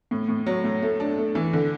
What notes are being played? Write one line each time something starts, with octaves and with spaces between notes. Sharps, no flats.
A2
A2
F#3
A2
A3
D4
A3
E3
D3